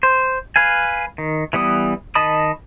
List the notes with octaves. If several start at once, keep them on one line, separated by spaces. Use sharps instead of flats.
C5
B4 F5 G#5
D#3
E3 G3 B3 D#6
D#3 D#5 A5 B5 D#6